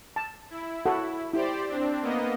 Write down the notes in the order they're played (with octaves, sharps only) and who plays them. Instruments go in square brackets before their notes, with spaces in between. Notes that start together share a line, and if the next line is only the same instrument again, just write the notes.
[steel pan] A5
[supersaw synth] E4
[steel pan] F#4 A4 F#5
[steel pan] E4 [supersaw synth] G4 C5 D5
[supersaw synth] C4 D4
A#3 B3 D#5